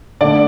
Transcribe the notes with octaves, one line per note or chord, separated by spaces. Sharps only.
D3 A3 D5